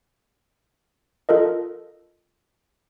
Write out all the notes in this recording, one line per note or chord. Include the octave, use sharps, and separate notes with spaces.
F4 A4 A#4 D#5